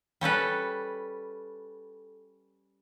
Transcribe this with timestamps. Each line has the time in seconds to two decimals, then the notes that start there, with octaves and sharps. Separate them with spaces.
0.21 G3 C#4 A4 B4